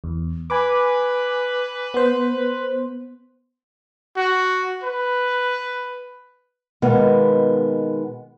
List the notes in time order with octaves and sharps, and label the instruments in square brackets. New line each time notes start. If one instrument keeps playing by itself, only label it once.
[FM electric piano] E2
[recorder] B4 [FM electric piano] G#5 B5 D6
[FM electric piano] B3 C5
[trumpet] F#4
B4
[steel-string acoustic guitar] B2 D#3 G#3 A#3 B3